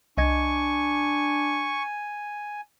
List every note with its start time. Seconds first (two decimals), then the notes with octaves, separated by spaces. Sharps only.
0.18 C2 D4 D#5 G#5 C#6 G#6